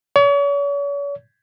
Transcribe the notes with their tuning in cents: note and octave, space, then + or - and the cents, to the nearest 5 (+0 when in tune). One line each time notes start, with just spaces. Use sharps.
C#5 +40